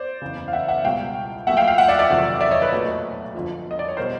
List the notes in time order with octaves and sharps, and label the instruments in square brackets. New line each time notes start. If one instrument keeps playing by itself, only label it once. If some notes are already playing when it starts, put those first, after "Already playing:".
Already playing: [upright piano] C5 D5
F#1 E2 C#3
F5
E5 F#5
E5 F#5
C#2 B2 G3 F5 G5
A#1 A#2 F#3 A3 E5 F#5
F5 G5
F5 G5
E5 F#5
D5 E5
D5 E5
G1 F2 C3 D#3 F#3
D5 E5
C#5 D#5
B4 C#5
B1 A#2 F#3 A3
G1 F2 D3 F3
D#5
D5
C#5
B2 G3 A#4 C5